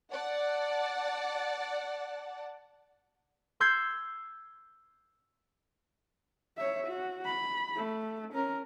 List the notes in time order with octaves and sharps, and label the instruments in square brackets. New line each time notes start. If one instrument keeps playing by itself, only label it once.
[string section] D5 F#5 A5
[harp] C6 E6 G6 G#6 C7
[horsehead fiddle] C#5 E5
F#4
B5
A3
C#4 A#4